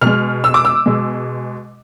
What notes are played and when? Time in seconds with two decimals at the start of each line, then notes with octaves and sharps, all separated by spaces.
0.01 B2 G#3 F6
0.44 E6
0.54 D6
0.65 E6
0.86 B2 G#3